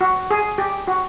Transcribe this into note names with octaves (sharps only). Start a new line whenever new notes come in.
F#4
G#4
G4
F#4